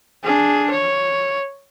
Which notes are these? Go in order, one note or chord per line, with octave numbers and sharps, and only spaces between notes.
D4 G#4
C#5